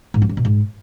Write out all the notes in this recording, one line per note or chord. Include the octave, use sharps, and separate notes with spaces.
G#2
G3
G2
B2
G#2